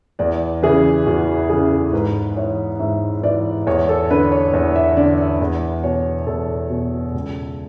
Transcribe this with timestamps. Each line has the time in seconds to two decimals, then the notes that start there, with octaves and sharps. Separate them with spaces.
0.19 E2 D5
0.63 C#3 E3 G#4
1.06 E2 F#4
1.49 C#3 E3 G#4
1.71 A4
1.93 G#2 B4
2.36 E3 C#5
2.79 G#2 E5
3.23 E3 D5
3.66 E2 C#5
3.89 A4
4.10 D3 B4
4.32 C#5
4.53 E2
4.76 E5
4.97 D3 D5
5.19 E5
5.41 E2
5.84 B2 C#5
6.27 E2 A4
6.70 B2
7.14 C#2